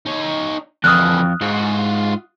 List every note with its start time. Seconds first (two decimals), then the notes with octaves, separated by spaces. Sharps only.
0.06 D#4 C#5
0.84 F2 D3 E3 D#6 F6 F#6
1.41 G#2 F4 F#4